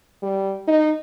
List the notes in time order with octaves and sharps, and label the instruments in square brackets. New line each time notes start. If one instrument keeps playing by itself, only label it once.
[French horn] G3
D#4